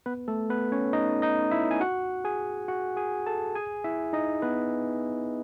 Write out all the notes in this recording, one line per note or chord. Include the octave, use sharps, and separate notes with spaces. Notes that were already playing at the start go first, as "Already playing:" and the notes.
B3 B4
A3 A4
B3 B4
C#4 C#5
D#4 D#5
D#4 D#5
E4 E5
G#5
F#4 F#5
G#4 G#5
F#4 F#5
G#4 G#5
A4 A5
G#4 G#5
E4 E5
D#4 D#5
B3 B4